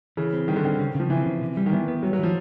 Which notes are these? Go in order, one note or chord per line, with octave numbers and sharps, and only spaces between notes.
C#3 E3
C4
D#3 G3
D3
D#3 C4
C#3
C#3
F3
E3 C4
C#3
C3
G3
D#3
E3 B3
B3
F#3 G3
F#3
E3 F3